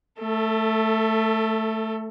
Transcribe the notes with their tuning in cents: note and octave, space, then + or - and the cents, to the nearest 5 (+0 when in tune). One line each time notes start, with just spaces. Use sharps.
A3 +0 A4 +30